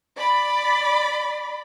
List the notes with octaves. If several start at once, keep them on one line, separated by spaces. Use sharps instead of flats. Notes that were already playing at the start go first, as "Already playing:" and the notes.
D5 B5